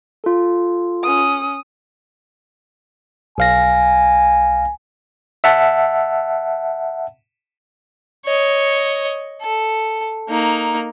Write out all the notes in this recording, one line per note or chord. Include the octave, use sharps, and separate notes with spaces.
F4 A4
C#4 D#6
B1 F5 G#5 A#6
E5 F#5 A5
C#5 D#5
A4
A#3 D#4